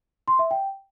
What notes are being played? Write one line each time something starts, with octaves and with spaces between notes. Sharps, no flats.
C6
E5
G5